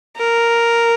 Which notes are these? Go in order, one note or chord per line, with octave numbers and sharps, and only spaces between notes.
A#4